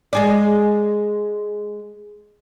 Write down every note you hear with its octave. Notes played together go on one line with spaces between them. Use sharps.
G#3 G#4 D5